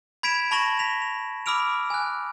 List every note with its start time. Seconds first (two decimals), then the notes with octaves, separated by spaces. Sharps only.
0.23 B5 G#6 B6 D7 E7 F7
0.51 A5 B5 C#6 A#6 E7 F#7
0.79 A#6 B6 F7
1.02 F7
1.46 B5 D6 E6 F6 D7 F7
1.90 G#5 F#6